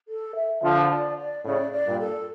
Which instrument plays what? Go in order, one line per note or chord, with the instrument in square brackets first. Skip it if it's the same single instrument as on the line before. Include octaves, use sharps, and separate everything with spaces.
[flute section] A4
E5
[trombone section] D3 F3 [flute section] A5
[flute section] D5
D5
[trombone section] A2 C#3 [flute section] D5
[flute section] D5
[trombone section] G2 A#2
[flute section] A4